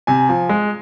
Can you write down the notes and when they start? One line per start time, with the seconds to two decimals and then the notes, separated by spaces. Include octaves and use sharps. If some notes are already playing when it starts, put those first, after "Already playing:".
0.07 C3 G#5
0.29 F3
0.49 G#3